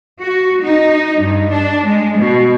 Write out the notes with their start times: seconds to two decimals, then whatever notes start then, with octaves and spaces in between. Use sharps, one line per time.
0.20 F#4
0.62 D#4
1.20 G2
1.51 D4
1.85 G#3
2.18 B2